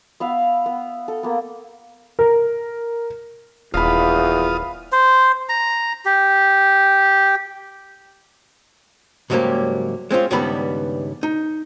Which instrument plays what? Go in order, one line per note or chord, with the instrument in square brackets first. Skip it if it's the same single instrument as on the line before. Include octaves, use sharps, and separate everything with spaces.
[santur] B3 E5 F5
B3
A4
A#3 B3
[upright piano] A#4
[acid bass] D#1 [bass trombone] E2 [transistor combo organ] F4 D#6 [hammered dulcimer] F5 B5
[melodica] C5
A#5
G4
[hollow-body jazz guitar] C#2 G#2 F#3 G3 A#3 G4
G#3 C4 C#4 F4
C#2 G2 D#3 G3 B3 B5
D#4